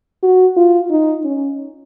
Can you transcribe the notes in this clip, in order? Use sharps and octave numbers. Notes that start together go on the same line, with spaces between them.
F#4
F4
D#4
C#4